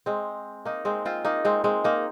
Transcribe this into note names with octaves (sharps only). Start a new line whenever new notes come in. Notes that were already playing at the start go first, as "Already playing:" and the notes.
G#3 C4
A#3 D#4
G#3 C4
C4 F4
A#3 D#4
G#3 C4
G#3 C4
A#3 D#4